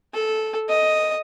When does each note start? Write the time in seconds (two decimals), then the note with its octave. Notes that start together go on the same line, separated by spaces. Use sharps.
0.14 A4
0.69 D#5